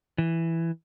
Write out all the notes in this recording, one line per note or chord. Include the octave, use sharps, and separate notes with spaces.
E3